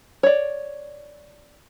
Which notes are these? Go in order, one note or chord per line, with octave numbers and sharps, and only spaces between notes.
C#5 D5